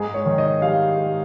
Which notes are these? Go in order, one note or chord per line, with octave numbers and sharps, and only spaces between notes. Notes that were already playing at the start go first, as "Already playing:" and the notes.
Already playing: G#2 G#4
C#5
D#3
D#5
G3 F5
G#2